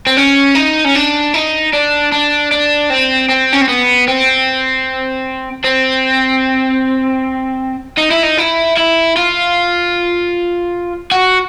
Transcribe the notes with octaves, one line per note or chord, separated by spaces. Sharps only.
C4
C#4
D#4
C#4
D4
D#4
D4
D4
D4
C4
C4
C#4
C4
B3
C4
C4
D#4
E4
D#4
E4
E4
F4
F#4